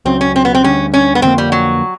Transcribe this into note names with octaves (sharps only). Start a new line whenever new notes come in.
C#2 C#3 F#3 C4
C#4
C4
B3
C4
D2 D3 G3 C#4
C#4
B3
F2 D3 F3 A#3 C4
G3
F#3